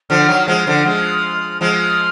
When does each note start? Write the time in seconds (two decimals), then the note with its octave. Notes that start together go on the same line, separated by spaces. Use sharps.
0.10 D3 F3 F6
0.28 D#3 F#3
0.47 F3 G#3 F6
0.67 D3 F3
0.85 F3 G#3
1.61 F3 G#3 F6